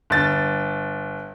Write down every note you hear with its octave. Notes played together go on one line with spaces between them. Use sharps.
G1 A6